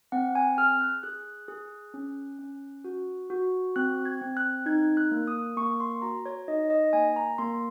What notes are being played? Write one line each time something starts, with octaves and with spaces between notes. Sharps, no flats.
C4 F#5
G#5
G#4 F6
F#6
G#4 F#6
G#4
C#4
C#4
F#4
F#4
C4 F#6
G#6
C4
F#6
D#4 G#6
F#6
A#3
D#6
A#3 C#6
C6
F#4 A#5
C#5
D#4 D#5
D#5
A#3 G#5
A#5
A#3 C6